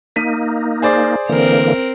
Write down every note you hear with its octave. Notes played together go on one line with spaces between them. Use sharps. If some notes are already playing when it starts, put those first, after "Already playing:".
A#3 D#4 B6 D#7
G#4 C5 D5
D3 E3 A#3 C4 A#4